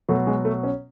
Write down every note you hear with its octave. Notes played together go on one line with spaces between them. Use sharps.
B2 F#3 A3
G#3
A3
C#4